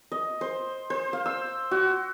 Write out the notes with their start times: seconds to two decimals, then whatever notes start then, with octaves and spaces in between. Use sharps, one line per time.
0.12 D#5
0.41 C5
0.90 C5
1.13 F5
1.26 E6
1.71 F#4